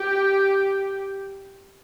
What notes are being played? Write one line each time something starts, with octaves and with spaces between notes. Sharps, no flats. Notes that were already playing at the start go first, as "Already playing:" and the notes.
Already playing: G4